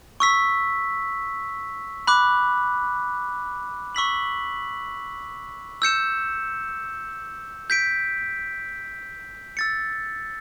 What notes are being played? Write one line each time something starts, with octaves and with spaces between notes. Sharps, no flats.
C#6 E6 B6
B5 D6 F#6
C#6 E6 B6 F#7
E6 G6 C#7 E7
G6 B6 D7
E6 A6 C#7